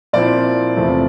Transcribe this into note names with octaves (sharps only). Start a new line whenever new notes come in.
A#2 F3 C4 E4 D5
E2 C3 F3 A3